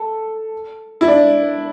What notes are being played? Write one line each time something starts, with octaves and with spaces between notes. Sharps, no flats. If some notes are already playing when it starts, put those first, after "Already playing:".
Already playing: A4
E4
D4